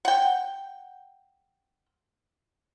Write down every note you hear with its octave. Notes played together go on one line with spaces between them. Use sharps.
F#5 G5